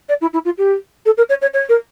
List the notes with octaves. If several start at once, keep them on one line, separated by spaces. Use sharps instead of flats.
D5
E4
E4
F4
G4
A4
A#4
C#5
C#5
C#5
A#4